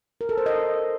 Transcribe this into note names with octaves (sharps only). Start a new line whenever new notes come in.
A#4
A4
C5
D#5